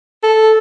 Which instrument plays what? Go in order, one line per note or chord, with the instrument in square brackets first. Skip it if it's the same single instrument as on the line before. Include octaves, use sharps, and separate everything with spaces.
[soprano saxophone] A4